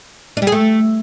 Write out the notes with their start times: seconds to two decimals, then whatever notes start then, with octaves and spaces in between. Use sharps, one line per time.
0.37 D4
0.42 G3
0.47 G#4
0.52 A3